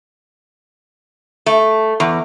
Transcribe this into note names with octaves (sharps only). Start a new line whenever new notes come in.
A3
E2